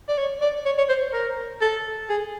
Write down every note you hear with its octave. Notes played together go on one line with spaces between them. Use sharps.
D5
C#5
D5
C#5
C#5
C5
A#4
A4
G#4